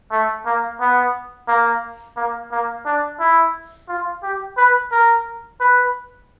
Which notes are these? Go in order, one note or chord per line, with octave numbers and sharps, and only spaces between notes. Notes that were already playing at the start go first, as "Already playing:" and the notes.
A3
A#3
B3
A#3
A#3
A#3
D4
E4
F4
G4
B4
A#4
B4